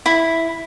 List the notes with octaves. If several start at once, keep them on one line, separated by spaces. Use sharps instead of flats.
E4